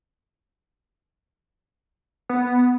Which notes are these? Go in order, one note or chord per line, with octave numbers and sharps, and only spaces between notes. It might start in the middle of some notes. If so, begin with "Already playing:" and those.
B3